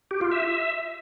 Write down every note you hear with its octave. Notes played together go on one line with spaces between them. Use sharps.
G4
F4
E5